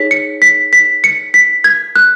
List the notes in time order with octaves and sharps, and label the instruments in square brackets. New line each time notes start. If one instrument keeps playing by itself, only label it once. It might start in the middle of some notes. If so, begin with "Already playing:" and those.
Already playing: [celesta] D#4 G#4 C#5 B6
C#7
B6
B6
C#7
B6
G#6
F#6